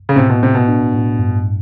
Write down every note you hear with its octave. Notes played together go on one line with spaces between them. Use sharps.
C#3
A2 C3
B2
A2 C3
B2
D4
A2
G2